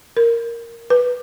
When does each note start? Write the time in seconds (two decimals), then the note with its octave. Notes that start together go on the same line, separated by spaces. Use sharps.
0.17 A#4
0.90 B4